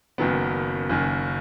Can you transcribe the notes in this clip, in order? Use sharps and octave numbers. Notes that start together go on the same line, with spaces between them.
F#1 F#2 D#3 F#3 B3
F#1 F#2 D#3